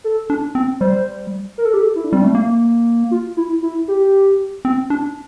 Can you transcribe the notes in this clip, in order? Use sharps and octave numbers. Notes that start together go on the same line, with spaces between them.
A4
D4
C4
G3 C5
A#4
A4
G4
A4
E4
D4
G3 C4
A3 D4
A#3
F4
E4
E4
G4
C4
D4